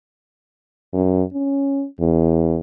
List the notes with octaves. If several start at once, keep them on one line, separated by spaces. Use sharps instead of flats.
F#2
C#4
E2